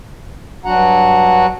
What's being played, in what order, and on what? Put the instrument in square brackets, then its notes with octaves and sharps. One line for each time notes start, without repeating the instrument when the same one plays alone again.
[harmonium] G2 F#3 D4 F#4 F#5 A#5